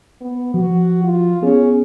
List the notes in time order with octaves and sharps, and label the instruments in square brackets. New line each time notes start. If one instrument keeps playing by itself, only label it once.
[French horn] B3
[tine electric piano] F3 [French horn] F#4
[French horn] F4
[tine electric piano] B3 G#4 [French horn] C#4